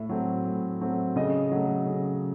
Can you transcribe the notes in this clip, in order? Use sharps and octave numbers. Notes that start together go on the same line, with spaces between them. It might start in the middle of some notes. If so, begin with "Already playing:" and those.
Already playing: A2 E5
F#3 A3 C4
A2
F#3 A3 C4
C#3 D#5
F#3 A3
C#3